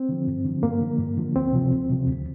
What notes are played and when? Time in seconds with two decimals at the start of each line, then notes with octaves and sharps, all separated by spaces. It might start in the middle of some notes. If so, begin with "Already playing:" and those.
Already playing: C4
0.09 D3 F3
0.27 G2
0.45 D3 F3
0.63 G2 A#3
0.81 D3 F3
0.99 G2
1.17 D3 F3
1.36 D2 C4
1.53 C3 F3
1.72 D2
1.90 C3 F3
2.07 D2